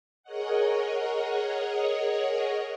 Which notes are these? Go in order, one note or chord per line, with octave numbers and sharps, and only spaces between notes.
G#4 A#4 C#5 D#5 F#5